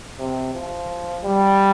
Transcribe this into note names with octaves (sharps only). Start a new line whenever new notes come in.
C3
F3
G3